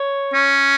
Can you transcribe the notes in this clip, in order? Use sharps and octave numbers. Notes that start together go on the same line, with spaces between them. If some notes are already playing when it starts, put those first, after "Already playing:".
Already playing: C#5
C#4